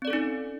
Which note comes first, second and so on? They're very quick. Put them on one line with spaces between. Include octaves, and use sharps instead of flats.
C4 D5 A4 C#4 D#4